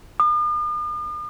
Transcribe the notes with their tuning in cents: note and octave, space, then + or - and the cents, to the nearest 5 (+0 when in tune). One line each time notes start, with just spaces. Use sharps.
D#6 -45